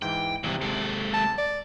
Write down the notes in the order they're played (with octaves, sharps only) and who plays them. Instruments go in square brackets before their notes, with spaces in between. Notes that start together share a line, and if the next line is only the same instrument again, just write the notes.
[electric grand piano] G#2 E3 [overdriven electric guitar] G5
[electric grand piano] G#1 C3 [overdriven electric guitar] G2 E3
[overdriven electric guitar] G#3 A4
[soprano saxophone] A5
D5